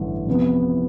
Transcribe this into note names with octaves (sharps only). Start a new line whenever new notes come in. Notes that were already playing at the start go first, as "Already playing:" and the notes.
Already playing: A1 G2 D3 A3
F2 C3 E3 B3